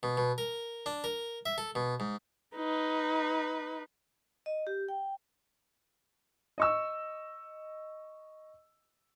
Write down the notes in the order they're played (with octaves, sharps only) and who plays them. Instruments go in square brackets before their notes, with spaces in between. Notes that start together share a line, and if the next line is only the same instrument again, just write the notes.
[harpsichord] B2
B2
A#4
D4
A#4
E5
A4
B2
G#2
[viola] D#4 B4
[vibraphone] D#5
G4
G5
[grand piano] D#5 C#6 E6